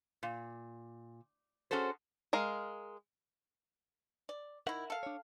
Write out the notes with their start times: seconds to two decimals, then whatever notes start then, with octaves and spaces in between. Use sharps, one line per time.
0.23 A#2
1.71 C#4 F#4 G#4 A4 C5
2.33 G#3 A#4 F5
4.29 D5
4.67 D#3 E4 A#4 E5 F#5
4.90 A4 F5
5.03 D4 C#5